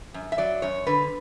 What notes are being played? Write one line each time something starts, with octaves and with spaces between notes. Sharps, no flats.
F#2
E5
F#3 D5
F#2 C#5
D3 B4